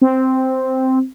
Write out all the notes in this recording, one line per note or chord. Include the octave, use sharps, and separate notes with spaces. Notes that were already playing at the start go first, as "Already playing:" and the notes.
C4